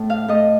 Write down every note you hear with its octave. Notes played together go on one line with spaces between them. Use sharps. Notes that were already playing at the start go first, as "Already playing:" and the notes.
Already playing: A2
F5
A2 D#5